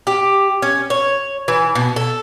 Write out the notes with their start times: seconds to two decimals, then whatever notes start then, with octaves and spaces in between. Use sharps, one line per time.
0.07 G4
0.62 C#4
0.90 C#5
1.48 E3
1.75 B2
1.96 A4